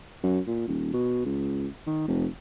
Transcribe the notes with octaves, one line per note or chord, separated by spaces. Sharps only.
F#2
A#2
D#1
B2
C#2
D#3
F1